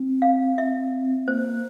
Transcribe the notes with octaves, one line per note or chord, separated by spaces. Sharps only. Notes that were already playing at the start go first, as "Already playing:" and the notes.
Already playing: C4
F5
E5
A#3 C5